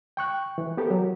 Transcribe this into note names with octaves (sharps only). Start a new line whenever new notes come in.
G5 C#6 F#6
E3
B3 G4 A4 A#4
F#3